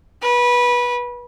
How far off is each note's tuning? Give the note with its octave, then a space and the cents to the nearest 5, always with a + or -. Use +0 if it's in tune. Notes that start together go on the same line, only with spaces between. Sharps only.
B4 -20